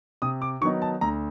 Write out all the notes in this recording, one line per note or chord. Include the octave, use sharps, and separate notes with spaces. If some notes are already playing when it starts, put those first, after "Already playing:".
C3 D#6
D6
D#3 F#3 B3 D#4 C#6
A5
D2 A#5